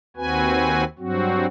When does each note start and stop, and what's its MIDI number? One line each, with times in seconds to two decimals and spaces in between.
0.17 0.84 39
0.17 0.84 60
0.17 0.84 66
0.17 0.84 71
0.17 0.84 80
0.99 1.46 43
0.99 1.46 54
0.99 1.46 60
0.99 1.46 66